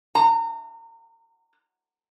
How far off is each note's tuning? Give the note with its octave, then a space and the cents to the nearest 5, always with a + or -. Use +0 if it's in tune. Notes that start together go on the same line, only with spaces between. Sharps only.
A#5 -30